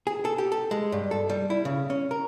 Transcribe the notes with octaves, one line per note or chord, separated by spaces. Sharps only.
G#4
A4
G4
A4
G#3
G2
A4
G3
E4
C#3
C#4
A#4